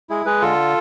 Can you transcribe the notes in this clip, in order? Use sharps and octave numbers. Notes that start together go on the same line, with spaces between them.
G#3 E4 G#4
G#3 G#4 B4
D3 F4 A4